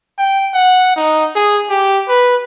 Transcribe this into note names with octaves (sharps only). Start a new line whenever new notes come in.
G5
F#5
D#4
G#4
G4
B4